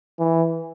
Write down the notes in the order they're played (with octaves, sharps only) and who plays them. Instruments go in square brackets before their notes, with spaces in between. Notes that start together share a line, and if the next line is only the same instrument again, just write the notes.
[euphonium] E3